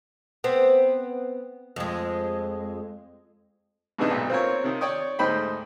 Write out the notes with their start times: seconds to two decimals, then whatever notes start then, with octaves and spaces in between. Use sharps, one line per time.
0.44 B3 C4
1.76 F2 G#3
3.99 G#2 C3 E3 B3 D4 D#4
4.11 B1 A#2
4.30 C4 F4 A#4 C#5
4.64 C3 D#3
4.81 C#5 D5 G5 C#6 D#6
5.19 D2 G#2 D#4 C5 G5 B5